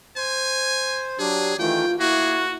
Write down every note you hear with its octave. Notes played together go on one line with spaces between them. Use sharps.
C5 G#5
F#3 D4 G4 G#4
D#3 E3 A3 F4 G5
A#3 E4 F#4 G#4